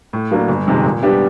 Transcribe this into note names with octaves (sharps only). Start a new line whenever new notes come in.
A2
F#3 A#3 D4
G1
F2 C3 D#3 G#3
A#2
G3 B3 D4 G4